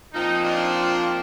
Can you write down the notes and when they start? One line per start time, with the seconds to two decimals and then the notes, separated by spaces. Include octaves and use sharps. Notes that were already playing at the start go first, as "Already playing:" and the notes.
0.13 A#2 F3 C4 D#4
0.44 D4 F4